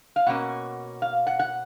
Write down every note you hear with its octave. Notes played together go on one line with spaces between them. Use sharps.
F5
B2 A#3 C#4 F#5
F5
F#5
F#5